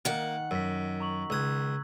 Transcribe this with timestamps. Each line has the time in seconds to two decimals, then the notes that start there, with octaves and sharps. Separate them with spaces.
0.05 D#3 A#3 F#5
0.51 F#2 E6 A#6 B6
1.00 A#5 C#6 F#7
1.30 C#2 D#6 E6 F#6 G#6